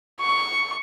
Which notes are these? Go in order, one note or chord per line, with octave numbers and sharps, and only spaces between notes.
C#6